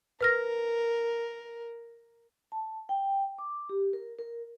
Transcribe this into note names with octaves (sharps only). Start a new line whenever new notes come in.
A#4 B4 F6 A#6
A5
G5
D6
G4
A#4
A#4